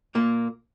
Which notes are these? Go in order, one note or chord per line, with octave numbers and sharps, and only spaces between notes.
A#2 A#3